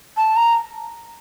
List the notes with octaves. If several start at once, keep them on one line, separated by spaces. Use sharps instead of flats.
A5
A#5